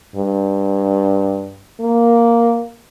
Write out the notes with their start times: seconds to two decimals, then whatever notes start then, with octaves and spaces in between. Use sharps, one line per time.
0.16 G2
1.80 A#3